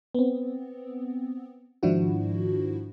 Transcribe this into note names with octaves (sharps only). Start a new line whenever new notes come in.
B3 C4
G#2 D#3 F3 D4 E4 F#4